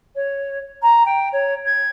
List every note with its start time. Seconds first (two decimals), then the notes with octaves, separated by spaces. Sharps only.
0.15 C#5
0.82 A#5
1.06 G5
1.32 C#5
1.66 G#6